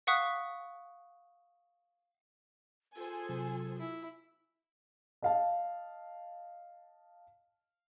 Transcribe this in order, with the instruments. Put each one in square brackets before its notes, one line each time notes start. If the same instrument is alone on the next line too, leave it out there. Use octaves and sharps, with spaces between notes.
[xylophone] F5 F#5 C#6 D#6 F#6 B6
[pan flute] F4 [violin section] G#4 C5 G#5 [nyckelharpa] A4
[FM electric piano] C3 F#3
[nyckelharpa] E4
[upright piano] D#5 F5 A5